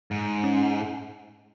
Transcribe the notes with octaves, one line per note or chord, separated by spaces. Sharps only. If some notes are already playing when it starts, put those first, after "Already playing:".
G#2
C#4